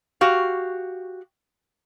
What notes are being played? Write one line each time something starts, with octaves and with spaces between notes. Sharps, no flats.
F#4 G4 F5